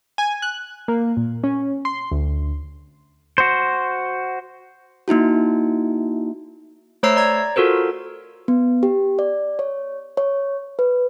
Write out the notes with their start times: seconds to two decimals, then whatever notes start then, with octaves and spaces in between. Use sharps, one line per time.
0.18 G#5
0.42 F#6
0.88 A#3
1.17 A#2
1.44 C#4
1.85 C6
2.11 D2
3.38 F#4 C5
5.08 A#3 D#4 E4 F#4
7.03 A3 C5 C#5 A#5 E6 C7
7.16 D5 A#5 G#6
7.56 F4 F#4 A4 A#4 C5
8.48 B3
8.83 G4
9.19 D5
9.59 C#5
10.17 C#5
10.79 B4